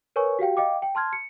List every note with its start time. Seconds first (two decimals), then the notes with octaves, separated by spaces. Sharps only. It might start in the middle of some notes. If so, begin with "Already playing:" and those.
0.16 A#4 B4 C#5 G#5 C#6
0.39 F#4 G4 F5 G5
0.57 D#5 F5 G5 D6
0.82 G5
0.95 A5 C6 F6 G#6
1.13 C#7